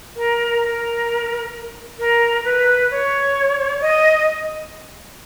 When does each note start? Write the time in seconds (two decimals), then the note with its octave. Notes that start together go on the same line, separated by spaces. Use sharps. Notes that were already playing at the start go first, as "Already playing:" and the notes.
0.16 A#4
0.63 A#4
1.99 A#4
2.44 B4
2.91 C#5
3.81 D#5